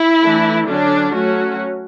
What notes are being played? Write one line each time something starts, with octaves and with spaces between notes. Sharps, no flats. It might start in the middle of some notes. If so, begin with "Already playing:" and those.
Already playing: E4
E3 A3 D4
D3 F#3 C#4 D4
F#3 A3 C#4 F#4